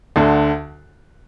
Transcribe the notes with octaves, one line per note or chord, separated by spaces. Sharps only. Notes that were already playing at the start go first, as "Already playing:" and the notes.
D2 D3